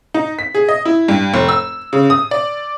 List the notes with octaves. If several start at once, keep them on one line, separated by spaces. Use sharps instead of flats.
D#4
B6
G#4
D#5
E4
G2
F1
E6
C#3
D#6
D5